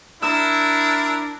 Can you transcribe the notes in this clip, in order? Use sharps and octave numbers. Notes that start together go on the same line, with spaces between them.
D4 E4 A#4 E6